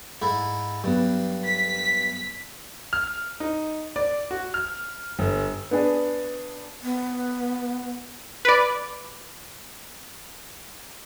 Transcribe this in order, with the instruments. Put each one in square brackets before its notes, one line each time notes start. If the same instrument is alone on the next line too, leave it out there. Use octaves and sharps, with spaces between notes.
[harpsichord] G#2 E4
[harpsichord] G2 [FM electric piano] F#3 B3
[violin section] B6
[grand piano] F6
D#4
D5
F#4
F6
G1
[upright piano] B3 D4 G#4
[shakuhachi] B3
[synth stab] B4 D5